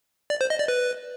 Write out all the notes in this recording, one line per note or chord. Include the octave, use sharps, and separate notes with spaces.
D5
C5
D#5
D5
B4